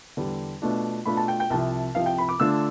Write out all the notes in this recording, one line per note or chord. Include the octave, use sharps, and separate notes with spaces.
E2 D3 G3
B2 A3 D4 F4
B2 A3 D4 F4 B5
A5
G5
G5
C2 C3 F3 A5
C2 C3 F3 F5
G5
B5
D6
D3 A3 D4 F4 E6